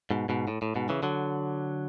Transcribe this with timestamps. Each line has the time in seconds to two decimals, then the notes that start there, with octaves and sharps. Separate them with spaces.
0.11 G#2 B2
0.29 G#2 B2
0.48 A2
0.62 A2
0.76 G#2 B2
0.89 C#3 E3
1.03 D3 F#3